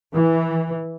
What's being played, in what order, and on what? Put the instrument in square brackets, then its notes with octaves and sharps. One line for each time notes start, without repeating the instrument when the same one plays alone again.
[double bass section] E3